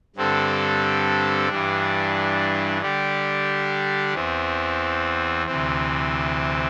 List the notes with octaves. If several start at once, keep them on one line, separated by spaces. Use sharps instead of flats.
G2 D3 G3 C4 A4
G2 E3 G3 D4
D3 G3 D4 G4
E2 E3 C4
D2 C3 E3 C4